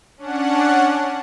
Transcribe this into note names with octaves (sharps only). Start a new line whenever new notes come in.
C#4 D4 F#5